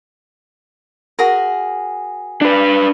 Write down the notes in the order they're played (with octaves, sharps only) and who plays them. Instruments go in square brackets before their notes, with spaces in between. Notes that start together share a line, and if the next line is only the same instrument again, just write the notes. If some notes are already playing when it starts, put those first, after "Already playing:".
[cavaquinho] F#4 G#4 A#4
[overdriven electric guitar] D4 B4